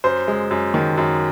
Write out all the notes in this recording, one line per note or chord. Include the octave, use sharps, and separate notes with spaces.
F#2 C5
G#3
F#2
D#3
F#2